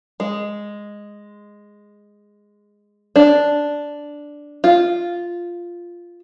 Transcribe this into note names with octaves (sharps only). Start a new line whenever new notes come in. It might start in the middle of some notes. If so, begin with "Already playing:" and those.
G#3
D4
F4